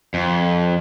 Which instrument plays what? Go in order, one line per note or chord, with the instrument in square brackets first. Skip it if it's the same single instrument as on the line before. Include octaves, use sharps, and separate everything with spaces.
[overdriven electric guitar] F2